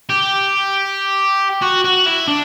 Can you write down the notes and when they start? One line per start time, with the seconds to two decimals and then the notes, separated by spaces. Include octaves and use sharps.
0.09 G4
1.62 F#4
1.85 F#4
2.06 E4
2.28 D4